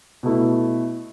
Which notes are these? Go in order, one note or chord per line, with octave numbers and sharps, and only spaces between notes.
B2 A3 E4